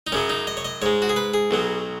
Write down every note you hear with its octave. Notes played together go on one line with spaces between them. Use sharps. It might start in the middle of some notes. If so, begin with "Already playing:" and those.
D#4
F#2 C#3 F#3 C#4
D#4
D#5
C#5
D#5
G#2 G#3 C#5
F#4
G#4
B4
G#4
B1 B2 F#3